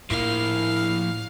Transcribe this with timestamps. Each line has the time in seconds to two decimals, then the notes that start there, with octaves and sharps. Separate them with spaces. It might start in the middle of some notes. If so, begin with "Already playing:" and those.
0.10 A2 F3 A#3 E4 F5